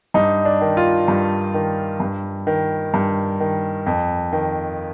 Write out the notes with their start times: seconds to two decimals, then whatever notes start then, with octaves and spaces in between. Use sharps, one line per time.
0.14 G2 D#4
0.45 D4
0.61 D#3
0.77 F4
1.08 G2
1.54 D#3
2.00 G2
2.47 D#3
2.94 G2
3.40 D#3
3.86 F2
4.33 D#3